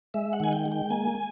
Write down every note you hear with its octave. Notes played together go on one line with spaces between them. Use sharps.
G#3 E5
F#5
D#3 G#5
G5
G#3
G5
A#3 G#5